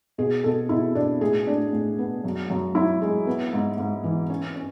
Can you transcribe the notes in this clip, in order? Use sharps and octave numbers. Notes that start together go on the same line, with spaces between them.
B2 G#4
B2 A4
B2 E4
B2 D4
A2 G#4
A2 D4
A2
B3
F#2
F#2
F#2 E4
G#3
B3
G#2
G#2
E3
C#4
C#4